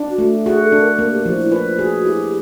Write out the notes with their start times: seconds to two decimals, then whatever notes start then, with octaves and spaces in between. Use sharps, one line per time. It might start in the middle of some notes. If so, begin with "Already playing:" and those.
Already playing: D4
0.10 F#4
0.18 A3
0.46 F#4 G#4
0.63 A4
0.72 D4
0.81 A#4
0.99 A#3
1.12 G4
1.26 F3 F4
1.38 E4
1.52 F4 B4
1.79 F#4 G#4
2.05 E4 G4